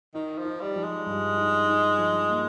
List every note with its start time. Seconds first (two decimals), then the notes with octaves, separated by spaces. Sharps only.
0.14 D#3 D#4
0.38 F3
0.45 D#4
0.61 G3
0.76 F3
0.83 G#3
1.06 G2
1.37 D#4
1.68 D#4
1.99 F3
2.29 A#3